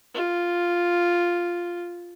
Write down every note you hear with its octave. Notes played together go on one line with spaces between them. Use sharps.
F4